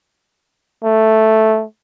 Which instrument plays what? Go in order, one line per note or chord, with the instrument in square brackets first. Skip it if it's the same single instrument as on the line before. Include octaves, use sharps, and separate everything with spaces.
[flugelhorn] A3